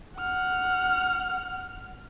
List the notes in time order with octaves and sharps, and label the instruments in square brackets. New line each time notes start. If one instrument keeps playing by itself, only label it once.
[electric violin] F#5 F6